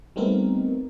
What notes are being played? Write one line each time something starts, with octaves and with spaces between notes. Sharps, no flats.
G3 A3 B3 C4 D#4 A#4